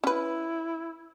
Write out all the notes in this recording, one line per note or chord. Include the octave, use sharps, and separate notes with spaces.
C#4 E4 B4